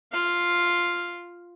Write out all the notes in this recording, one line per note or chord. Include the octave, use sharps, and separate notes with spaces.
F4 F5